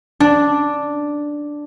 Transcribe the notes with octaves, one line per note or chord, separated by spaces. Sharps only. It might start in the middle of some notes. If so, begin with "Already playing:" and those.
D4